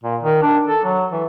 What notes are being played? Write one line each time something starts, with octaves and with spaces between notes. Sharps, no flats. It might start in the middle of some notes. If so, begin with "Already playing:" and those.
A#2
D#3
D4
A4
F#3
E3